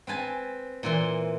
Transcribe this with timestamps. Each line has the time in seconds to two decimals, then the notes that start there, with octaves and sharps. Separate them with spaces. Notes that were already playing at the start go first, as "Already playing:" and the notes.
0.07 C4 B4 G#5 A5
0.83 A#2 E3 C6